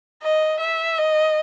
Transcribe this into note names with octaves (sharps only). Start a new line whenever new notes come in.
D#5
E5
D#5